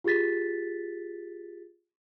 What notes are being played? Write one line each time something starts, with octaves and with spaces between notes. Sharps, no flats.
F4 G4 G#4 A6 B6